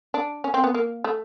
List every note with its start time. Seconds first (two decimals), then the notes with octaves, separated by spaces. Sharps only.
0.14 D4
0.44 C#4
0.54 C4
0.64 B3
0.74 A#3
1.04 A3